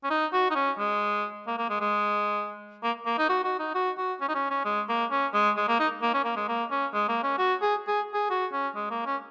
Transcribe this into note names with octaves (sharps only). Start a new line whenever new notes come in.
C#4
D#4
F#4
D#4
C#4
G#3
A#3
A#3
G#3
G#3
A#3
A#3
D#4
F#4
F#4
D#4
F#4
F#4
C#4
D#4
C#4
C#4
G#3
A#3
C#4
G#3
G#3
A#3
D#4
A#3
C#4
A#3
G#3
A#3
C#4
G#3
A#3
C#4
F#4
G#4
G#4
G#4
F#4
C#4
G#3
A#3
C#4